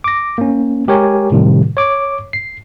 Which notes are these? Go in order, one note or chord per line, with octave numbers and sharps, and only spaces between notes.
D6 A#6
A#3 C#4
G#3 G4 A#4 C#5 G#5
A2 C3 D#3 G3
C#5 D6
C7